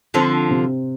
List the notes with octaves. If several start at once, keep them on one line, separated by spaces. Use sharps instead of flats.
D3 F3 C4
C3